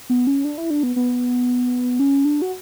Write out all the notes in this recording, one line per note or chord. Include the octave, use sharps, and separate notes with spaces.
B3
C#4
D4
E4
D4
B3
B3
C#4
D4
F#4